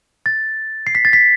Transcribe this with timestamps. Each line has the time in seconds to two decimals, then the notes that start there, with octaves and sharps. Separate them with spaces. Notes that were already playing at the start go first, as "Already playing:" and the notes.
0.26 A6
0.87 C7
0.95 B6
1.05 A6
1.13 B6